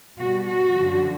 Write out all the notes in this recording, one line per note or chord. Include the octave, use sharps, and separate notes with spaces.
B2 G3 F#4
F#4
F#2 D3 F3